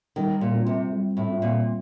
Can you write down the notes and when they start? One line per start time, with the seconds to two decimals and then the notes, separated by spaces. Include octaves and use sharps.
0.16 D#3 G3
0.41 A#2
0.54 C4 F4
0.66 C3
0.92 G3
1.17 A2
1.29 C4 F4
1.42 A#2